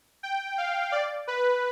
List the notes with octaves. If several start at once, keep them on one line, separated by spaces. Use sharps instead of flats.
G5
F5
D5
B4